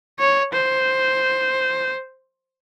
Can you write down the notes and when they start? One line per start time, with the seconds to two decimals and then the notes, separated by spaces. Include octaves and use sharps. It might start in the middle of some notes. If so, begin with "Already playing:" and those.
0.19 C#5
0.52 C5